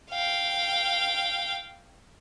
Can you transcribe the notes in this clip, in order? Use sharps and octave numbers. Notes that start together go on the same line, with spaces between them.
F5 G5